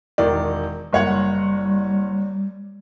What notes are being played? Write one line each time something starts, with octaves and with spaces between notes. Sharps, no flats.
E1 D#3 D5
F#1 G3 C#5 F#5